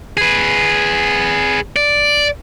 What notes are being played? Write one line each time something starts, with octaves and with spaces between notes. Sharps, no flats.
G#4 B4
D5